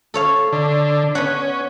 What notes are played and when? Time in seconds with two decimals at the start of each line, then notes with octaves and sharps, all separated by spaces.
0.14 A4 C#5 F5
0.53 D3
1.15 B3 C#4 F#5